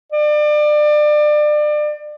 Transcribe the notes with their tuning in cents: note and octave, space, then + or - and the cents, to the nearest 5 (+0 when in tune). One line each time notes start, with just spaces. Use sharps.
D5 +30